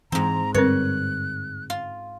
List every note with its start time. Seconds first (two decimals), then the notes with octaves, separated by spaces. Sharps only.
0.12 G#2 E3 C4 A#5
0.54 G2 D3 G3 C4 A#4 B4 C#5 F#6
1.70 F4